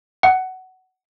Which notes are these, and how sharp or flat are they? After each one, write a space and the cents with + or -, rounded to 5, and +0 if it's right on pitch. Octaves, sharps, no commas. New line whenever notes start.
F#5 +15